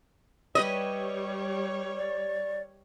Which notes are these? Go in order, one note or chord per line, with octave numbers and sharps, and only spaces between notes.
G3 G4 B4 C#5 D#5 E5
D5